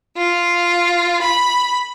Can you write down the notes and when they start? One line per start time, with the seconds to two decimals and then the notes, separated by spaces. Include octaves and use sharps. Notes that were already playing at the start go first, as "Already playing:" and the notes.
0.17 F4
1.23 B5